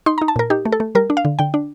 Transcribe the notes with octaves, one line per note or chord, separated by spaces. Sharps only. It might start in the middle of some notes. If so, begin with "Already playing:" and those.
D#4 C6
D#4 A#5
A5
A#2 A#4
D#4 G4
A3
A4
A3
G3 A#4
D4
F5
D3
D3 G5
D4